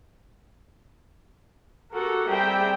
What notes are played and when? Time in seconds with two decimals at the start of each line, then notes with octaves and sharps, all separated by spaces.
1.93 F#4 G4 A4 A#4 F#5
2.28 G3 C4 G#4 E5 G5 A#5